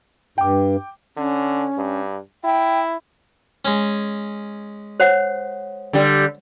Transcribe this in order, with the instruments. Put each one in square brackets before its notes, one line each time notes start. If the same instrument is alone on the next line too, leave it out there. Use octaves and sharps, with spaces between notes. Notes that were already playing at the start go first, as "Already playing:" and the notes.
[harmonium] G2 [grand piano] G5 D6
[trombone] D3 [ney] C#4
[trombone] G2
[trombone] E4 [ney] G5
[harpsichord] G#3 C#4
[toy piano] C5 C#5 F#5
[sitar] D3 G3